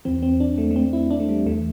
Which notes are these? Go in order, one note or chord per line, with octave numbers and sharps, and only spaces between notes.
E2 E3 C4
C4
D4
A3
A3
C4
E4
D4
A3
G3
E2 E3 A3